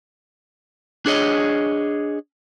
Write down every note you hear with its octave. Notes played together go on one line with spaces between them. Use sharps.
D4 G#4 C#5 D#5